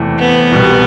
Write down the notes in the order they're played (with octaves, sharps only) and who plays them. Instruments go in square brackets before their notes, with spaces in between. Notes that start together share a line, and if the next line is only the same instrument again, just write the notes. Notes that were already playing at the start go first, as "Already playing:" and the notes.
Already playing: [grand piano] E2 C3 E3 A3
[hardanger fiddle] B3
[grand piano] C2 B2 G3